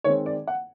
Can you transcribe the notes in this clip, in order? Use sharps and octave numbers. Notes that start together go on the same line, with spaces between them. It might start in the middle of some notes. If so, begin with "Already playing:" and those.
D#3 G#3 C4 C#5
D5
F#5